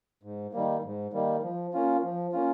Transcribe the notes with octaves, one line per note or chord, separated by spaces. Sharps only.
G#2
D#3 G3 A#3
G#2
D#3 G3 A#3
F3
A#3 C#4 F4
F3
A#3 C#4 F4